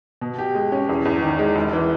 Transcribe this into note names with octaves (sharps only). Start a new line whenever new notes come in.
B2
G4
G#3
C#4
E2
E2
D#3
G#3
E1
E3